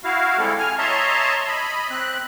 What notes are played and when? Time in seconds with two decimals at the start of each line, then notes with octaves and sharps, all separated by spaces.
0.04 E4 F#4 F5
0.38 D3 G3 G#3 C4 E4 A4
0.59 G#5 F6
0.78 C#5 D#5 E5 A5 A#5 C6
1.48 D#5 B5
1.91 C4 F#6